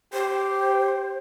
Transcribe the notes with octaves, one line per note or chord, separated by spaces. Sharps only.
G4 C5